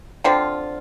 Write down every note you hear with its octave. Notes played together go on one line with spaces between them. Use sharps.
D3 F3 C4 F4